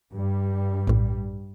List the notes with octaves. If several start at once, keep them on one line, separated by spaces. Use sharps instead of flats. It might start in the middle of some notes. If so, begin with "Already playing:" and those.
G2 G3
A#1 A2